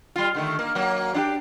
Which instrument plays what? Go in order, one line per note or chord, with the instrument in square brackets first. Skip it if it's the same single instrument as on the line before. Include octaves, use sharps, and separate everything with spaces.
[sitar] G3 F4
D3 D#3 A3
A#3
F#3 A#3
D4 E4 G4